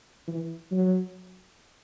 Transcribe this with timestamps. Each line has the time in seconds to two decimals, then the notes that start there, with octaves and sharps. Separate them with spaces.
0.28 E3
0.72 F#3